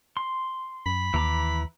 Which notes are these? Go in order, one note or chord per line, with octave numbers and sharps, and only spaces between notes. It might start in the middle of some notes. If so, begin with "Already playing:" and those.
C6
F#2 B5
D#2 E3 A#5 D6